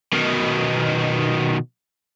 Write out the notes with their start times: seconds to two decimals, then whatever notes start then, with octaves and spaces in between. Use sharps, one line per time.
0.13 B2 D#3